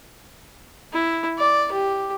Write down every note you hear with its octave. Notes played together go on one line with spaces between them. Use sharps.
E4
D5
G4